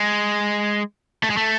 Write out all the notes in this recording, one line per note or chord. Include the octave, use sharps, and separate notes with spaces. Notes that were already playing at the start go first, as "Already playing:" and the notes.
Already playing: G#3
A3
G#3
A3